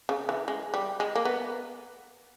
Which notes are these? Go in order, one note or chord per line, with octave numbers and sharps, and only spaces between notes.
C#3
E3
G#3
G3
G#3
A#3
B3